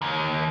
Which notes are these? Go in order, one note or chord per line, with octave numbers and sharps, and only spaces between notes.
D#2